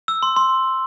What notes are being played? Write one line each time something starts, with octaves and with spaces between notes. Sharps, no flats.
E6
C6
C6